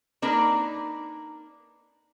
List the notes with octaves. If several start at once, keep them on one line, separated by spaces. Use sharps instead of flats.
A#3 D4 D#4 A#4 B4 D5